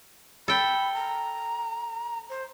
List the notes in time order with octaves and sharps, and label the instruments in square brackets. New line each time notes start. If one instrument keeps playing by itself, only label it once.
[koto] A4 G5 [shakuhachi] B5
[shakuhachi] A#5
C5